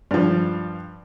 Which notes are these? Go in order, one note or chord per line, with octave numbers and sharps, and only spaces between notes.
G2 F3